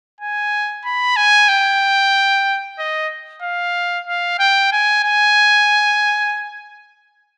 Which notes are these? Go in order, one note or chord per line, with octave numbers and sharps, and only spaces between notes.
G#5
B5
G#5
G5
D#5
F5
F5
G5
G#5
G#5